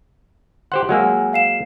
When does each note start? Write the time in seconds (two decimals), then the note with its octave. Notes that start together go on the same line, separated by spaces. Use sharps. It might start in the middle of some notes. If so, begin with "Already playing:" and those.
0.72 G4 C5 F#5 C6
0.89 F#3 G#3 A#3 F#5 G#5 E6
1.33 F5 C7 E7